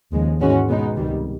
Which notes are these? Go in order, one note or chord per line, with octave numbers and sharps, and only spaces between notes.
D#2 C#3 F3 G#3
G#2 E3 G#3 C#4 F#4
B2 G#3 B3 D#4
C#2 C3 D#3 G3